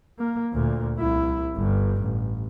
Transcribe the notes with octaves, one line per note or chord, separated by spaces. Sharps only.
A#3
D2 A#2
C2 E4
G1 G2
A1